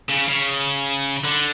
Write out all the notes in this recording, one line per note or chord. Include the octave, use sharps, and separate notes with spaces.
C#3
C#3
D3